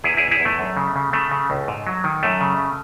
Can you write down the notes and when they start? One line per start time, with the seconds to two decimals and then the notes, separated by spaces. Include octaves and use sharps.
0.04 E2 E4 G#4
0.17 E4 G#4
0.23 E2
0.31 E4 G#4
0.40 E2
0.45 A3
0.59 F#2
0.77 C#3
0.96 C#3
1.13 C#3 A3
1.31 C#3
1.50 C#2
1.68 G#2
1.87 F#3
2.04 D#3
2.23 F#2 A3
2.41 C#3